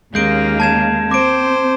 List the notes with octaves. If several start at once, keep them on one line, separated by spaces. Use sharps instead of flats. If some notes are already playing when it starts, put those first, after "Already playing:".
D#2 G#3 A#3 C#4 F5 G6 D7
A5 G#6 E7
C4 C5 D6 D7